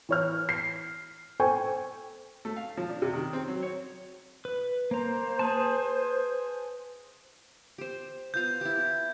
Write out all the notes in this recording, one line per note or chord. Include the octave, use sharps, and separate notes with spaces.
E3 C#5 F6
C7
A4 C5 G5 G#5 C#6
A3
F5
F3
D4
C3
D#3
C4
F#3
C#5
B4
A#3 C5 A#5
G#4 B4 A5
G4 C5
B3 F4 F5 G6
E4 G4